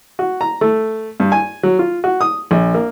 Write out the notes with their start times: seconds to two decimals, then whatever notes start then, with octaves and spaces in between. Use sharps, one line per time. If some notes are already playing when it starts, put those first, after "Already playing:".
0.19 F#4
0.41 A#5
0.61 A3
1.20 G2
1.32 G#5
1.63 F#3
1.79 F4
2.04 F#4
2.21 D#6
2.51 A#1
2.75 A#3